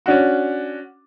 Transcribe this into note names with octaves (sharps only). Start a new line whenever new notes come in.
C#4 D4 F#4